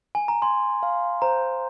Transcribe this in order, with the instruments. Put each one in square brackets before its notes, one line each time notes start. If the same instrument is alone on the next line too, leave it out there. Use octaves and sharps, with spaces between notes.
[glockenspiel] G#5
A#5
[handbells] G#5 [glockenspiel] C6
[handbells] F5
[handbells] C5 [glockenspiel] A#5